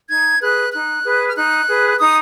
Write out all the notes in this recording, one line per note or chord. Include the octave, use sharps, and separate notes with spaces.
D#4 G#6
G#4 B4 F#6
D#4 F#6
G#4 B4
F6
D#4 F#6
G#4 B4
D#4 D#6